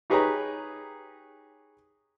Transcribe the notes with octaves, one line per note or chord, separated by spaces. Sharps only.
D#4 G4 G#4 B4 C#5 A#5